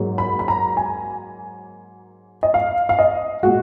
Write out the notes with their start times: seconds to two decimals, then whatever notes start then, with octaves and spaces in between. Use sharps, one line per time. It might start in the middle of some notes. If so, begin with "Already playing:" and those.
Already playing: G#2 F#3 A#3
0.18 B5
0.39 B5
0.48 A#5
0.77 G#5
2.43 D#5
2.54 F5
2.89 F5
2.99 D#5
3.43 A#2 G#3 F#4